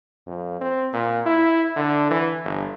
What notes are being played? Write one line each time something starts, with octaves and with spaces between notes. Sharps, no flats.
F2
C4
A#2
E4
D3
E3
G1